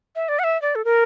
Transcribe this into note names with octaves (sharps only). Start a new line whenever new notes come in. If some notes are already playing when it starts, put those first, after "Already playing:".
E5
D5
F#5
E5
D5
A4
A#4